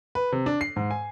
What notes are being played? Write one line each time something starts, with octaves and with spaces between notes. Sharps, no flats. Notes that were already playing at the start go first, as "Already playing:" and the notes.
B4
C3
D4
C7
G#2
G#5